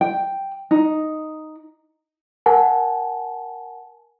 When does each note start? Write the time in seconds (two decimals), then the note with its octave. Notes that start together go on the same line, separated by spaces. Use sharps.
0.01 G5
0.71 D#4
2.46 A#4 F#5 G#5 A5